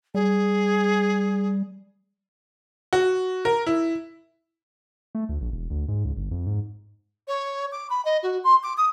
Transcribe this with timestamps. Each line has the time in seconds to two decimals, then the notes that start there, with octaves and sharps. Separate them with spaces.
0.15 G3 G#4
2.93 F#4
3.45 A#4
3.67 E4
5.15 A3
5.29 D2
5.41 A#1
5.53 E1
5.70 D2
5.88 G#2
6.05 C#2
6.17 G1
6.31 F2
6.46 G#2
7.28 C#5
7.72 D6
7.90 B5
8.05 D#5
8.23 F#4
8.44 C6
8.63 D6
8.77 D#6